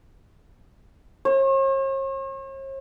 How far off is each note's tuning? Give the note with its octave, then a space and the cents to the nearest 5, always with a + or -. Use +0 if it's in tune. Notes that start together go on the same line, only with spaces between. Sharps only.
C#5 -45